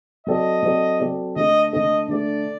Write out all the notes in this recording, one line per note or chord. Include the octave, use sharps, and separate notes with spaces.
F#3 C4 F#4 A4 D5 D#5
F#3 C4 F#4 A4 D5
F#3 C4 F#4 A4 D5
D3 A3 D4 A4 D#5
D3 A3 D4 A4 D#5
D3 A3 D4 A4 D5